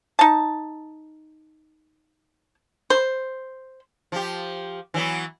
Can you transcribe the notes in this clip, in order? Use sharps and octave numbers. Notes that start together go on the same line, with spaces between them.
D#4 A5
C5
F3 G4
E3 F#3 B3